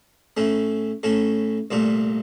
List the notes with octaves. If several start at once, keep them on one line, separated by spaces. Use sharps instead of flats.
A2 A3 C#4
A2 A3 C#4
C2 A#2 A3